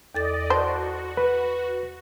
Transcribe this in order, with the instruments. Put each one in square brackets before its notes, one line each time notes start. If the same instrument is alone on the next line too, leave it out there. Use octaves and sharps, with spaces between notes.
[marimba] E2 A4 A6 [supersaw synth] D5 D#5
[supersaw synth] F#4 [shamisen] C5 [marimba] D5 A5
[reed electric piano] B4